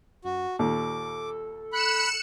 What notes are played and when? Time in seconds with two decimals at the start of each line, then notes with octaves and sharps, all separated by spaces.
0.24 F#2 F#4
0.59 D#2 A#2 A4 D6
1.72 B5 F#6 C#7 E7